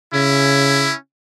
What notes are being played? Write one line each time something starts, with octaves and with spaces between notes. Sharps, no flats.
C#3 C#4 E4